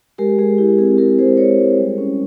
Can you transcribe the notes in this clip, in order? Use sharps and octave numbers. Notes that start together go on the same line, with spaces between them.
G#3 G4 A#4
G#3 G#4
E4 G4
C4 G#4
G#4
G#3 G4 A#4
G#3 G#4 C5
E4 A#4 C#5
G#3
G3
C#4